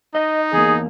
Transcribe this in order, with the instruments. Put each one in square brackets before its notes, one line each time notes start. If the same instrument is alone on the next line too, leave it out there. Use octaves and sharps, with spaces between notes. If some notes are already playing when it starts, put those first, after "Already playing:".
[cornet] D#4 [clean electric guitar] D#5
[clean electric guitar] E2 A#3 [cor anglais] G#4